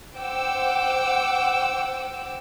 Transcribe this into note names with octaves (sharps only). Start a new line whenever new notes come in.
C5 F#5 G5 D6 E6